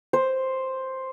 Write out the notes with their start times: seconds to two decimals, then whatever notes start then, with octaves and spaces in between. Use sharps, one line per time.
0.13 C5